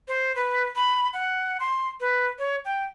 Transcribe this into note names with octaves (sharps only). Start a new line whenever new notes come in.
C5
B4
B5
F#5
C6
B4
C#5
G5